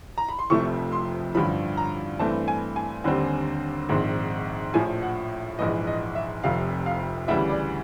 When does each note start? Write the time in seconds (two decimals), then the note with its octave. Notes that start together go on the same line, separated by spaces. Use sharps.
0.18 A#5
0.29 B5
0.39 C6
0.50 F1 F2 C3 F3 A3 C#6
0.92 C6
1.35 A1 G2 D3 F3 B5
1.77 A#5
2.19 G2 E3 A3 C4 A5
2.48 G#5
2.76 G#5
3.04 D#2 D3 G3 C4
3.89 A#1 G#2 D#3 G#3 C4
4.74 A#1 A2 F3 G#5
5.02 F#5
5.59 A#1 G#2 E3 D#5
5.87 D#5
6.15 E5
6.43 F1 F2 C3 F5
6.86 F5
7.28 D2 C#3 E3 G3 E5
7.49 D5